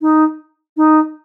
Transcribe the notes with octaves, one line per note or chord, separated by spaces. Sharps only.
D#4
D#4